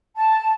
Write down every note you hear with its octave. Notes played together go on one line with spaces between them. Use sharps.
A5